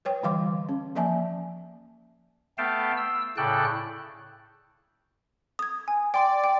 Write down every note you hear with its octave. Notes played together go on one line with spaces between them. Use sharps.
B4 C#5 G5
D3 E3 G3 F5 C6 D6
C#4
F3 A#3 D5 E5 G#5 A5
A3 B3 F5 G5 A5
E6
A2 C#3 A4 D5 G5 F#6
D#6 G#6
G#5
D5 G5 C6 D7
G5